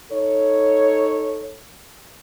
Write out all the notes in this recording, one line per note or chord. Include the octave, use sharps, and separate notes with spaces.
D#4 A4 C#5